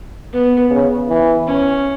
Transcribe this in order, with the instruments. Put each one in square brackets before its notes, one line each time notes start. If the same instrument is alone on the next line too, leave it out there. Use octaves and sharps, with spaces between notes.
[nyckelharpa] B3
[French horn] C#3
E3
[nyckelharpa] C#4